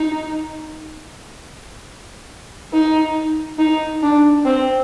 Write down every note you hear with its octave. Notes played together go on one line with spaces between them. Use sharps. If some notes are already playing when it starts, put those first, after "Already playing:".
Already playing: D#4
D#4
D#4
D4
C4